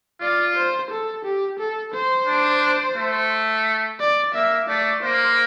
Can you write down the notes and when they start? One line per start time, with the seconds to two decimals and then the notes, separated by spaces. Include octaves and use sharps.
0.21 F4 D5
0.56 C5
0.90 A4
1.25 G4
1.59 A4
1.94 C5
2.27 D4
2.97 A3
4.00 D5
4.34 A#3 E5
4.69 A3 D5
5.03 A#3 C5